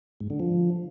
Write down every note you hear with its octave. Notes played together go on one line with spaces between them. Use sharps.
G#2
D3
F3